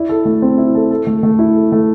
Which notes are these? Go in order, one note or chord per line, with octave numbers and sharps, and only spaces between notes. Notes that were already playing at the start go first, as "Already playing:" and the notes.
Already playing: E4 D5
A4
A3
C4
E4
A4
A4
A3
A3
E4
A4
A3